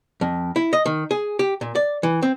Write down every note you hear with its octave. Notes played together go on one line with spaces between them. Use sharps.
F2
E4
D#5
D#3
G#4
G4
A#2
D5
E3
C4